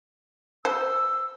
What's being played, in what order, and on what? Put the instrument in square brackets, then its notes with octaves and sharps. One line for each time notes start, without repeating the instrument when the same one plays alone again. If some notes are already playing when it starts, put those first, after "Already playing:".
[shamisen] C5 [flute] E6